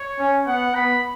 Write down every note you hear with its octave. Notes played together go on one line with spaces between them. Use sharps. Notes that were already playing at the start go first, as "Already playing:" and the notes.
Already playing: C#5
C#4
B3 F#5
B3 B5